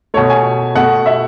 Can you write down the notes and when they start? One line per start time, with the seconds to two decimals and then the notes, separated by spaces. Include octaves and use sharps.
0.14 B2 A3 C#5
0.30 G#5
0.75 B2 A3 F#5
1.06 E5